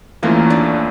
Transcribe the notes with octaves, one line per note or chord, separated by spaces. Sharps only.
E2 E3 A3 A#3 C#4 F4
D4